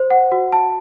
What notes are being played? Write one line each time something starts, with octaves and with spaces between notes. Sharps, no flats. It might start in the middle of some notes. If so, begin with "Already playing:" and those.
Already playing: C5
F#5
F#4
A5